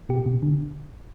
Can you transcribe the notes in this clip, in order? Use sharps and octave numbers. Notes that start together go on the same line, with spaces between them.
B2 G4
B2
D3